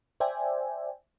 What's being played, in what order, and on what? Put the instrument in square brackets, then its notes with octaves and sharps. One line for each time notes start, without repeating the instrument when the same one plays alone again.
[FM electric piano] C5 D5 E5 G5 G#5